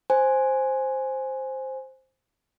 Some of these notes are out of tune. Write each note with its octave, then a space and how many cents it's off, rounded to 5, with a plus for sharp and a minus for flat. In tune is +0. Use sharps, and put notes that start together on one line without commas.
C5 +5 G#5 +0